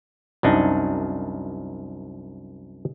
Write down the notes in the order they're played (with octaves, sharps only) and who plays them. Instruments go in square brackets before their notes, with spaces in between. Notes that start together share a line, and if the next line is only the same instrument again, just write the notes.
[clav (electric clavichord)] C2 F#2 D4 D#4